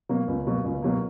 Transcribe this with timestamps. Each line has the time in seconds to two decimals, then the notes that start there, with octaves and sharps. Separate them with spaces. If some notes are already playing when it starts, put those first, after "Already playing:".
0.09 B2 F#3 A#3
0.28 C#2
0.47 B2 F#3 A#3
0.64 C#2
0.83 B2 F#3 A#3